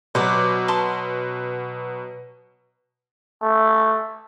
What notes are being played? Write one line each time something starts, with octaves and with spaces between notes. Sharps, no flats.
B2 F#3 C5 D5
A5 C6
A3